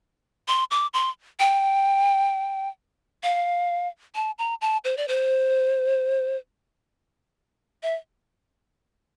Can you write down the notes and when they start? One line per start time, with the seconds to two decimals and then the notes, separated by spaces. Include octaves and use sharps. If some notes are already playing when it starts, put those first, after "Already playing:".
0.48 C6
0.71 D6
0.94 C6
1.40 G5
3.23 F5
4.15 A5
4.38 A#5
4.61 A5
4.84 C5
4.97 D5
5.08 C5
7.83 E5